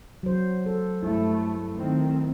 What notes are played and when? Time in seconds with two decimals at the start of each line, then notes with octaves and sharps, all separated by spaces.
0.23 F#3 C5
0.66 A4
1.03 G2 A3 E4
1.74 D#3 A3 C4